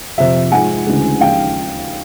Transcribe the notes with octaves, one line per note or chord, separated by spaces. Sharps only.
F2 C3 F3 E5
G#2 F3 G#3 F#5 G#5
D2 C#3 E3 G#3
D#2 C#3 F3 G#3 F5 G5